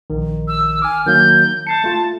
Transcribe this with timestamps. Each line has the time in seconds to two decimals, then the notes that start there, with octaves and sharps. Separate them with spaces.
0.10 A#1 D#3
0.48 E6
0.82 G#5 D6 F6
1.07 D#3 F#3 A#3 G6
1.67 A5 G6 C7 C#7
1.84 A3 F4